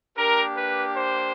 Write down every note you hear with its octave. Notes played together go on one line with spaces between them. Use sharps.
A#3 D4 G4 A#4
B4
C5